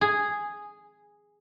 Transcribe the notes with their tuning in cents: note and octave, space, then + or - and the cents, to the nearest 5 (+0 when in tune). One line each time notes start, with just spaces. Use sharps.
G#4 -5